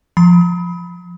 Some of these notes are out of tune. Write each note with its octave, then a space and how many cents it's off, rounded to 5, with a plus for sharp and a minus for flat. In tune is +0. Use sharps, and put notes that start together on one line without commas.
F3 +0 B5 +0